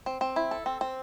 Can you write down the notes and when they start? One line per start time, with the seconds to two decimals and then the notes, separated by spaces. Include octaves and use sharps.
0.06 C4
0.21 C4
0.36 E4
0.51 A4
0.66 C4
0.81 C4